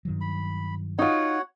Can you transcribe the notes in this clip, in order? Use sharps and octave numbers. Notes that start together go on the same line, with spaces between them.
G2 D#3 F#3
B5
D#4 F4 F#4 C#5 F#5